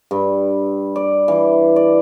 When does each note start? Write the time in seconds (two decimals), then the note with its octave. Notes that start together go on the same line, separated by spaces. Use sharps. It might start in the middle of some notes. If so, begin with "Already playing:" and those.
0.11 G2
0.96 D5
1.28 E3
1.76 D5